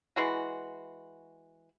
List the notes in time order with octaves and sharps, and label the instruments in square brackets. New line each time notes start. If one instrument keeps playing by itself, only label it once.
[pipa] E3 G#3 F#4